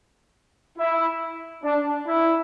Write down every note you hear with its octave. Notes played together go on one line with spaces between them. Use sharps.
E4
D4
E4